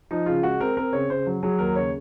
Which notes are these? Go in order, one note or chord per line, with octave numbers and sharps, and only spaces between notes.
F3 D#4
C#3 F4
G#3 F#4
C4 A#4
C4 A#4
C#3 C#5
C#3 C5
F#3
F#3 G#4
D#2 A#4
C#3 C#5